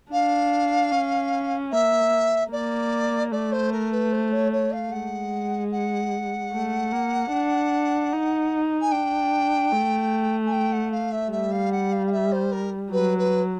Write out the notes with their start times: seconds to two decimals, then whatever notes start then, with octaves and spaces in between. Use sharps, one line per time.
0.12 D4 F5
0.92 C#4
1.72 A#3 E5
2.51 A#3 D5
3.32 A3 D5
3.52 C5
3.72 A#4
3.92 B4
4.12 C5
4.32 C#5
4.52 C#5
4.72 F5
4.92 G#3 F#5
5.72 F#5
6.52 A3
6.92 A#3
7.32 D4
8.12 D#4
8.81 G#5
8.92 D4 G5
9.72 A3
10.46 G#5
10.52 G5
10.72 F#5
10.92 F5
11.12 E5
11.32 G3 E5
11.52 F5
11.72 F#5
11.92 F5
12.07 F5
12.12 E5
12.32 C5
12.52 A#4
12.92 F#3 B4
13.18 B4